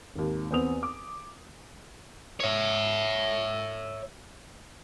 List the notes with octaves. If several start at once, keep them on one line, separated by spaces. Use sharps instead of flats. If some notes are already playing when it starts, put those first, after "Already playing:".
G#1 D#2
E2 B3 C4 B4 D#6 F7
D6
C#5 E5